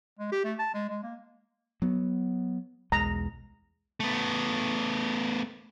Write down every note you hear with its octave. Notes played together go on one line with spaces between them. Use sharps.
G#3
G4
A3
A5
G#3
G#3
A#3
F#3 B3
B1 E2 G#3 A#5
A3 B3